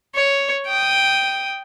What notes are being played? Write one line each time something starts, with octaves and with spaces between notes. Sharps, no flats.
C#5
G5 D#6